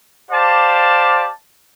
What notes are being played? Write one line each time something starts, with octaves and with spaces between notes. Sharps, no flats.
G4 C5 D5 F5 A5